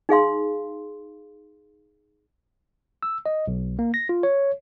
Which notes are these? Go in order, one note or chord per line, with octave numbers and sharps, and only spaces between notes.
D#4 G#4 F5 C6
E6
D#5
B1
A#3
A#6
F4
C#5